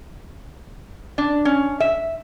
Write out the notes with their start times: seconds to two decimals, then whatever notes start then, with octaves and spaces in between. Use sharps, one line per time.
1.18 D4
1.45 C#4
1.80 E5